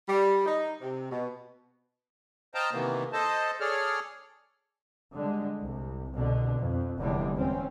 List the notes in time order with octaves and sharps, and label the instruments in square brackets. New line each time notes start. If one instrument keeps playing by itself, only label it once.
[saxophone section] G3
D#4
C3
B2
[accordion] C5 D#5 F5 G5 A5 A#5
C3 D#3 E3 A#3 B3
A4 C5 D#5 A5
G#4 A4 C#5 D5 F6
[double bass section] D3 G3 G#3
C2
C2 B2 D3
F2
F1 E2 D3 E3 G3 G#3
E2 C4 C#4